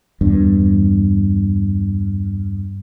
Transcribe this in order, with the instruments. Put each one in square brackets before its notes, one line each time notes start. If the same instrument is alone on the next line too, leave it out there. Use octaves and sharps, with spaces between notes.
[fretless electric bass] E2 G2